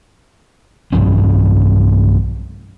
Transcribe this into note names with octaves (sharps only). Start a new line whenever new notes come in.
B1 G2 F3 C#4